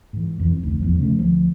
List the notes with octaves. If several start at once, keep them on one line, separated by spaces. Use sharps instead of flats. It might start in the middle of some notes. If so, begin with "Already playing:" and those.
G#2 E3
E1 F2 E3
F1 D2
G#1 E2 F3
C#3 F3 F#3 A3
D2 F3